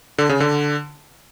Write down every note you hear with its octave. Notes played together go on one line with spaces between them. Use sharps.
D3
C#3
D3